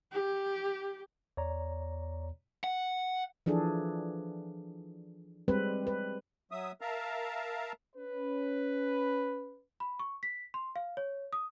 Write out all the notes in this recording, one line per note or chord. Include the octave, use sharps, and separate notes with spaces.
G4
E2 C#5 D5 A#5
F#5
E3 F3 D4 G#4 A4
G3 G#3 C4 B4
B4
F#3 E5 D#6
A#4 E5 F5 A5 A#5
C#4 B4
B5
C#6
B6
C6
F5
C#5
D#6